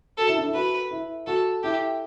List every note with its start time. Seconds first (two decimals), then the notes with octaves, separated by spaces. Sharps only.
0.18 F#4 A4
0.28 E4
0.37 D4
0.46 E4
0.54 F#4 B4
0.91 E4
1.27 F#4 A4
1.63 E4 G4